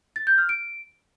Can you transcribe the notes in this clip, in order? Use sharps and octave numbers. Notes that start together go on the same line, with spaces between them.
A6
G6
F6
D7